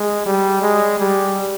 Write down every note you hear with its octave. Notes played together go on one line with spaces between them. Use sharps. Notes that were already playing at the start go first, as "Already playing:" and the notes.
Already playing: G#3
G3
G#3
G3